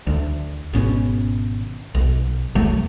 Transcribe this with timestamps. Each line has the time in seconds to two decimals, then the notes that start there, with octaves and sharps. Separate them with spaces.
0.07 D2
0.73 G#1 B2 C#4
1.95 B1
2.55 B1 E2 F#3 A3